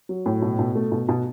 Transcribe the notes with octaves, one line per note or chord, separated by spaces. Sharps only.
F#3
A2
B2
B2
A3
B2
B2